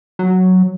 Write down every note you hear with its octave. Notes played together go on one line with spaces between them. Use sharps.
F#3